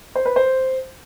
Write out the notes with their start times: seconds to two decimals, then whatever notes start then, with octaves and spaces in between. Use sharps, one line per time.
0.16 C5
0.26 B4
0.36 C5